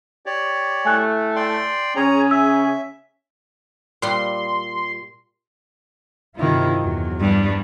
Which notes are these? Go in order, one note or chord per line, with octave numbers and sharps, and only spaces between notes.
G4 C#5 D5
A2 A3 G#5 F#6
D5 G5 C6
C#3 C#4 G#4 C#5 A#5
E5 E6
A#2 G3 C6
G2 C3 D#3 E4 F4
E2 F#3
G2 F3 D4